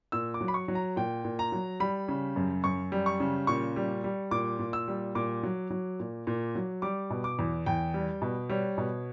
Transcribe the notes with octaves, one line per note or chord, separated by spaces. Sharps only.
A#2 E6
D6
F#3
B5
C#6
F#3
A#5
A#2 G5
A#2
A#5
F#3
G3 B5
C#3
F#2
F#2 C#6
G3
C#6
C#3
A#2 C#6
G3
G3
A#2 D6
A#2
E6
G3
A#2 D6
F#3
F#3
A#2
A#2
F#3
G3 D6
B2
D6
E2
E2 G5
G3
B2
G3 C#5
B2